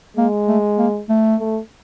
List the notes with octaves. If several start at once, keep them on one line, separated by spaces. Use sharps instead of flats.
G#3 A#3
A3
A#3
A3
A3